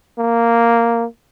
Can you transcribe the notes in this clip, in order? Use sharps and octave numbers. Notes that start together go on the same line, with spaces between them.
A#3